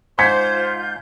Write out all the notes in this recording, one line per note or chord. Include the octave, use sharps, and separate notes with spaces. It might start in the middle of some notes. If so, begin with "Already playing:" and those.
G#2 F4 C5 G6 G#6 B6 C#7